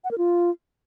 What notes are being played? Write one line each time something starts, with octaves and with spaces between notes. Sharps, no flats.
F#5
A#4
F4